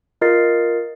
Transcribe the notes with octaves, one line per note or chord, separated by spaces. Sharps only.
F4 A#4 D#5 A6 C7